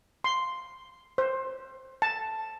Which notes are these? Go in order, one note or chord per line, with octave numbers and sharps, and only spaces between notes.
C6
C5
A5